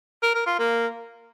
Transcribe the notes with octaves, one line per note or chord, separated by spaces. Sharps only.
A#4
A#4
F4
A#3